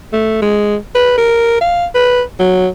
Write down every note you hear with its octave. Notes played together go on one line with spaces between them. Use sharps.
A3
G#3
B4
A#4
F5
B4
F#3